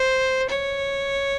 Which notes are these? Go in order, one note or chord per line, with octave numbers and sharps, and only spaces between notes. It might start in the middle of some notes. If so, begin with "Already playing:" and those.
Already playing: C5
C#5